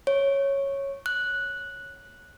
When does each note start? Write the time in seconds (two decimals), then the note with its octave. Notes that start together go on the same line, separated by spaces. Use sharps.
0.07 C#5
1.06 F#6